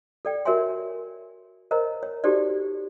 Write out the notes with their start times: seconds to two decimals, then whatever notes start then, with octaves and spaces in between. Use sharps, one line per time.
0.25 A4 D5 G5
0.45 F#4 A#4 C#5 E5 G#5 C6
1.71 A#4 C5 C#5 D#5 A#5
2.03 C#5
2.24 D#4 F#4 G4 A4 C5 D5